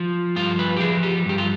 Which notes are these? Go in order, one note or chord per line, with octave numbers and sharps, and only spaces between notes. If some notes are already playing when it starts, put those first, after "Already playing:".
Already playing: F3
G2 F4
B4
G4
F3 G#4
G4
G2 G4
F4